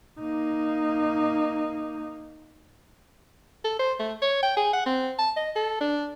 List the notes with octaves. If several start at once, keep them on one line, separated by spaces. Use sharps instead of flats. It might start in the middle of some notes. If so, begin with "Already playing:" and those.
A#3 D#4
A4
C5
A3
C#5
G5
G#4
F#5
C4
A5
D#5
A4
D4